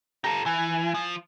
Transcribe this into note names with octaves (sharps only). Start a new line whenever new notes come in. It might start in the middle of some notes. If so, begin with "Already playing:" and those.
G4 A4 A#5
E3 G#5
F3